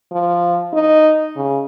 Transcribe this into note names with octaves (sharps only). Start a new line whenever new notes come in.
F3
D#4
C#3